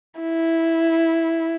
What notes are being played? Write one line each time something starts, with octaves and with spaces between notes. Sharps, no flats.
E4